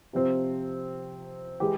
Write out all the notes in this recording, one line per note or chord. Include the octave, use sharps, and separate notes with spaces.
C3 F3 C4
E3 G#3 G4